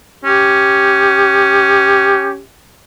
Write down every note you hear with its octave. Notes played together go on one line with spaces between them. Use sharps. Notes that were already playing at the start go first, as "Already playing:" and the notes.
C#4 G4